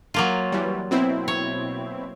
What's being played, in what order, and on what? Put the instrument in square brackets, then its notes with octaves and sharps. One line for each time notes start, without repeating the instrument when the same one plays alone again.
[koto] F#3 A#3 F4
[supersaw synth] E3 G3
B2 C4 E4
[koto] C#5